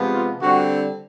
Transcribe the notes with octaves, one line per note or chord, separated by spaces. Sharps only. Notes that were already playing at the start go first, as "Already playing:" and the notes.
Already playing: C3 F3 G#3 B3
F4
D3 G3 C4 F#4